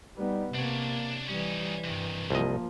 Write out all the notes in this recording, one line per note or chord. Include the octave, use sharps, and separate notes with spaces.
G3 B3 D#4
C3 A#3 D4 C#5
E3 G3 C#4 D#4
G2 C3 D#3
C2 F3 A#3 D#5